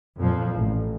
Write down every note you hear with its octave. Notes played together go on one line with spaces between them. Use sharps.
F2 A#2 F3
A1